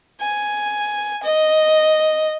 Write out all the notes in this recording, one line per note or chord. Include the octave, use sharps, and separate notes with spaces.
G#5
D#5